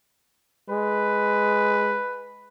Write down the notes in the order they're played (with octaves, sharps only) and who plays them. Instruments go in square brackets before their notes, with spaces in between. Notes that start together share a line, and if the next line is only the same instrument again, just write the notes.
[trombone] G#3 [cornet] B4